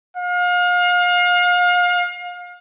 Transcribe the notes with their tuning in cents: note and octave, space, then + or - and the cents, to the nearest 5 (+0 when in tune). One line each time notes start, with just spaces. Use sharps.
F5 +35